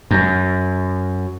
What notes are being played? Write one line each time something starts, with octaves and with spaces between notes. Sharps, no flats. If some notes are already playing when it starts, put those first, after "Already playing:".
F#2